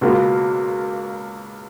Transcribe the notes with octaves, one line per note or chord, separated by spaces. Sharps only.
C#2 B2 A#3 F4